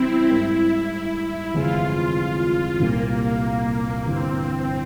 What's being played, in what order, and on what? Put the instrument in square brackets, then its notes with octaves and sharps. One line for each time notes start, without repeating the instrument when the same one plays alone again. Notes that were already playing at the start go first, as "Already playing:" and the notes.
Already playing: [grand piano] C#3 E3 G3 C#4 [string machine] C4 E4
[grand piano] G#2 G3 A#3
[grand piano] G1 F2 C3 E3 G#3 [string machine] F4
[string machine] F4
F4
[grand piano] C2 A#2 G3 [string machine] A#3
[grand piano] G1 G2 E3 [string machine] C4